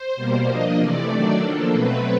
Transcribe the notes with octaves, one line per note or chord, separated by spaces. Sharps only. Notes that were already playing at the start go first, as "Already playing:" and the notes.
Already playing: C5
B2 G3 A#3
F3 A#3 D4 D#5
C3 E3 A3 D5
D#3 F#3 A3 D4 D5
F3 A#3 D4 A4
B2 F#3 A3 C4 B4